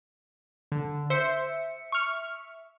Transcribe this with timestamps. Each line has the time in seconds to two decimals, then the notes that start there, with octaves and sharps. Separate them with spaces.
0.72 D3
1.10 C5 E5 C#7
1.92 C#6 F6